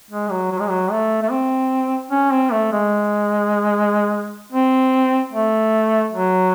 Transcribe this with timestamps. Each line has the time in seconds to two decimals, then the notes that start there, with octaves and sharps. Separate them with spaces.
0.11 G#3
0.30 F#3
0.51 F#3
0.60 G#3
0.69 F#3
0.91 A3
1.22 A3
1.31 C4
2.11 C#4
2.32 C4
2.52 A3
2.72 G#3
4.52 C4
5.33 A3
6.12 F#3